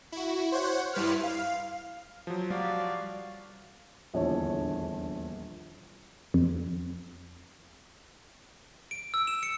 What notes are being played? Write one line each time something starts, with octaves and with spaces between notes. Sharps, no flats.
E4 F#4
C5 C#5 F#5
G2 G3 E4 B4 C6 F6
F5
F3 F#3
G3 F#4 D5 F5
D#1 A#1 E2 D3 C#5 A5
F2
D7
E6
E7
C#7